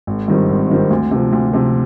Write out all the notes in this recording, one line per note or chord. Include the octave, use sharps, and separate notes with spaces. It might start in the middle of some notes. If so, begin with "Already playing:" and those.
G#1
G2 D#3 G3 C4
G#1
G2 D#3 G3 C4
D2
C3 F3
D2
C3 F3